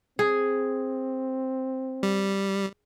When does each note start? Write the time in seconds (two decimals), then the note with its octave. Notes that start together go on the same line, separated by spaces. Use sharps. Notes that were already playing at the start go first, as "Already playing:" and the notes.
0.19 C4 G#4
2.03 G3